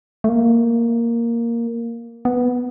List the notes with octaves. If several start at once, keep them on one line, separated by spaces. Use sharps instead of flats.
A3
A#3
B3